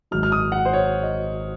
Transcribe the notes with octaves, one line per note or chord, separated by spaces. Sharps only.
G#1 G#2 F#3 F6
F6
D#6
F#5
C5
C#5
D#5